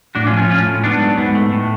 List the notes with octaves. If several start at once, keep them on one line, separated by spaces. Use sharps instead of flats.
A2 D4 F#4
C#4 F4
F3
C#4 F4
A2 C#4 F4
A2
G#2 B3 D4
F#3
G#2 B3
A3
A2